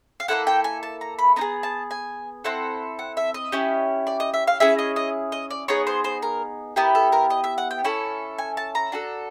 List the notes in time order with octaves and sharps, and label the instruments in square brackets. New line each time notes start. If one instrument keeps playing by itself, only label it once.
[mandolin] F5
A#3 C#4 E4 A4 F#5
G5
G#5
A5
A#5
B5
B3 D#4 A#5
G#4
A5
G#5
C4 E4 A4 F#5
F#5
E5
D#5
C#4 E4 G4
D5
D#5
E5
F5
C#4 E4 G#4 E5
D#5
D#5
D#5
D5
B3 D#4 G#4 C#5
C5
C5
A#4
B3 E4 G4 A#4
A4
A#4
D#5
E5
F#5
G5
C#4 E4 A4 G#5
G#5
A5
A#5
D4 F#4 A4